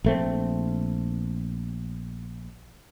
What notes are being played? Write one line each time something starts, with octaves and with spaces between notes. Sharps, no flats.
A#1 A3 C4